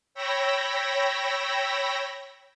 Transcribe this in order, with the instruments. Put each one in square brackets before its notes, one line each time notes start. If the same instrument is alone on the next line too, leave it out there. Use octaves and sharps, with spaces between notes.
[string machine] C#5 G5 B5 E6 A#6